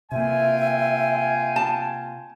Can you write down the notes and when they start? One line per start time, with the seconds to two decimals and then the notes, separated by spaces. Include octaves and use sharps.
0.12 C3 A#3 F4 E5 G5 G#5
1.56 A5